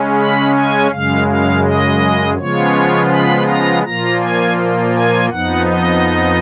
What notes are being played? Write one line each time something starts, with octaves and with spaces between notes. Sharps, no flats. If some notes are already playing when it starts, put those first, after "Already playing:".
Already playing: C#3 G#3 C#4
B5
G#5
F#2 C#3 G#3 F5
F5
D#5
C#3 F3 G#3 B3 F4 C#5
B5
A#5
A#2 F3 A#3 F4 A#5
G#5
G#5
F2 F3 B3 D#4 F#5
D#5